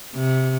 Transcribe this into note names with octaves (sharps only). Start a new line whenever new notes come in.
C3